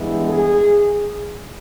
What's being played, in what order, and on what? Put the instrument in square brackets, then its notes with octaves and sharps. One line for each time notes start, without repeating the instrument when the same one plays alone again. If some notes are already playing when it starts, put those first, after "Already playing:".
Already playing: [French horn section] G2 E3 G#3 B3
G#4